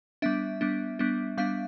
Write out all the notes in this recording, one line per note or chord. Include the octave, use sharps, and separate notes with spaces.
G3 B3 D4 E5
G3 B3 D4
G3 B3 D4
G3 B3 D4 F5